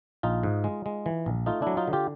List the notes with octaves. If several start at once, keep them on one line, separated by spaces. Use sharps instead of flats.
A#1 D#4 F4
G#2
G#3
G#3
E3
A#1
A3 D#4 F4
F#3 D4 E4
D#4 F4
D3
F4 G4